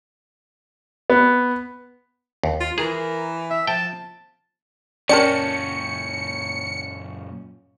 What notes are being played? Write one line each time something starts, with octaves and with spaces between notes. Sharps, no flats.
B3
D#2
F4
E3 G#4 A#4
E5
F3 G5 A5
F#2 A#2 C#4 A#4 D5 G5 A5 C#7